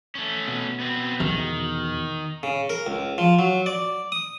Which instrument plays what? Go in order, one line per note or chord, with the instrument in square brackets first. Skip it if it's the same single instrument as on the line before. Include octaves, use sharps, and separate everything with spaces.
[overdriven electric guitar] A3 C#4
[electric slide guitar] B2
[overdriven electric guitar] B3 C4
[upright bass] E2 [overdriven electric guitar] D#3
[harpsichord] C#3
A#4
C#2
F3
F#3
D5
D#6